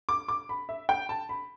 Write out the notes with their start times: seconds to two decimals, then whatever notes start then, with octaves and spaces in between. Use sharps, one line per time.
0.09 D6
0.28 D6
0.49 B5
0.69 E5
0.89 G5
1.09 A5
1.29 B5